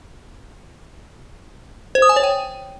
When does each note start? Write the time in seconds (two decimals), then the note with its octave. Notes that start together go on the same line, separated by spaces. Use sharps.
1.95 C5
2.02 D#6
2.09 G#5
2.16 C#5
2.24 G5